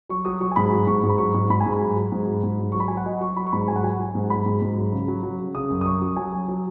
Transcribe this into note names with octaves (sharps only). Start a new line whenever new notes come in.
F#3 C#6
F#3 D#6
F#3 C#6
G#5
G#2 B5
F#3
G#2 C#6
G#2
B5
F#3 C#6
G#2
G#2 B5
G#5
G#2
B5
F#3
F#3
G#2
F#3
G#2
F#3
F#3 C#6
B5
F#3 G#5
F#5
F#3 D#5
F#3 C#6
F#3 B5
C#6
G#2 B5
F#3 G#5
F#5
F#3 G#5
F#3
G#2
F#3 B5
G#2
G#2
F#3
C#3
F#3
F#3
C#3
C#3 D#6
F#2
D#6
F#2 C#6
F#3
F#3 G#5
F#3
F#3